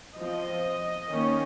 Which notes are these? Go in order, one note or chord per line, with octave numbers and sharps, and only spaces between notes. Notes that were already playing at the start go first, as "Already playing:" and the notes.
F3 C4 D#5
D#3 A#3 C#4